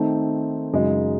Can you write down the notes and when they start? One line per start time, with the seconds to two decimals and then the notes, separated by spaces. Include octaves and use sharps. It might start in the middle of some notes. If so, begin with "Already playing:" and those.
Already playing: D#3 A3 C4 D#4
0.73 F#2 C#3 G#3 D#4